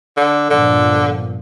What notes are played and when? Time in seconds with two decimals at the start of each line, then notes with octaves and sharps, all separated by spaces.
0.17 D3
0.50 G1 A#2 D3 F3